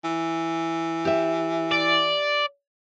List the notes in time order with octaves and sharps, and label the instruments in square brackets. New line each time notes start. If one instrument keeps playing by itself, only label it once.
[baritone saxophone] E3
[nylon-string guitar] G4 E5
[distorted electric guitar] D5